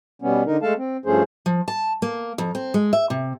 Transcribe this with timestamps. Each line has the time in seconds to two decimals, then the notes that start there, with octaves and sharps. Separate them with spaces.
0.22 B2 G3 B3 C#4
0.46 D3 D#4 A#4
0.62 G#3 A3 A4 F5 A5
0.78 C4
1.06 G2 F3 A3 C#4 G#4 C5
1.46 F3
1.68 A5
2.02 A#3
2.38 F2
2.55 C4
2.74 G#3
2.93 E5
3.10 C3